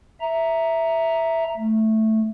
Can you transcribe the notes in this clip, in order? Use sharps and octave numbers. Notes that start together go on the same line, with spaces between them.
E5 A#5
A3